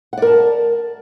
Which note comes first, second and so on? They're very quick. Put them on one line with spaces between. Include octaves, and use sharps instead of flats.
F#5 D5 A#4 A5